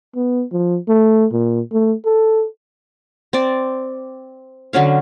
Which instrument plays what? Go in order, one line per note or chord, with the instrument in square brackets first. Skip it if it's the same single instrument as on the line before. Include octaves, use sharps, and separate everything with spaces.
[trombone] B3
F3
A3
A#2
A3
A4
[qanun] C4 D5
D3 F#3 C#4 F5